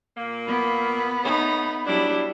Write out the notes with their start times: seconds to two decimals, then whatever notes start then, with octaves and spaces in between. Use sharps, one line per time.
0.17 A#2 A#3
0.47 B3 B5
1.24 A3 D#4 C#5
1.86 F#3 G3 D4 E4